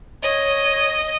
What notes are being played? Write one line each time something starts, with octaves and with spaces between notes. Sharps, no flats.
C#5 D#5